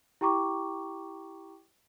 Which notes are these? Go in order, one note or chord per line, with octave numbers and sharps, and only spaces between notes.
E4 G4 G5 A#5 C#6 D6